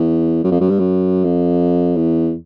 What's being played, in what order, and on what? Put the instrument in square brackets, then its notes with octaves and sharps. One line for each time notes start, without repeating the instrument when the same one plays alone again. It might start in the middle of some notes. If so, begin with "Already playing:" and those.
Already playing: [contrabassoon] E2
F#2
F2
F#2
G2
F#2
F2
E2